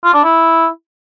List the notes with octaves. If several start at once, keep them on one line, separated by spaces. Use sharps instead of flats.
F4
D4
E4